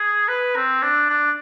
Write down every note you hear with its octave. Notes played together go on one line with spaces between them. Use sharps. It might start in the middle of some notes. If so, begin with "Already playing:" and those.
Already playing: G#4
B4
C4
D4
D4